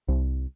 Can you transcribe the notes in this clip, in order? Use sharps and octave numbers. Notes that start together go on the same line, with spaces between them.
C2